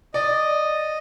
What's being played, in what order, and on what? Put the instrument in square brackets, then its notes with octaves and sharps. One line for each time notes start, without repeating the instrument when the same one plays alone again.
[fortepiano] D5 [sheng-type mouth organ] D#5